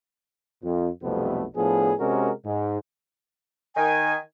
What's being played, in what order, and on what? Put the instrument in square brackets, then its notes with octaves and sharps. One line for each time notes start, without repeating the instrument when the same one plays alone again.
[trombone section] F2
B1 F2 C3 G3 A3 B3
A2 F3 B3 D4 G#4
C3 G#3 C#4 F#4 A#4
G#2
[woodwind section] D#3 G#5